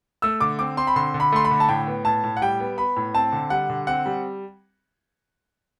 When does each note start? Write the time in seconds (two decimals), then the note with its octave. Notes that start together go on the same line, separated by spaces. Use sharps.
0.22 A3 E6
0.41 D3 D6
0.59 C4 D6
0.77 C4 C6
0.87 B5
0.96 D3 C6
1.14 D3
1.20 B5
1.32 A3 C6
1.45 B5
1.51 D3
1.60 A5
1.69 A2 G5
1.87 B3
2.05 A2 A5
2.24 A2
2.37 F#5
2.42 G3 G5
2.60 B3
2.77 B3 B5
2.96 A2
3.14 C4 A5
3.32 D3
3.50 G3 F#5
3.70 D3
3.87 C4 F#5
4.06 G3